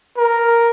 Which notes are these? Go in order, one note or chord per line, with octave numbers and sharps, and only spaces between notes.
A#4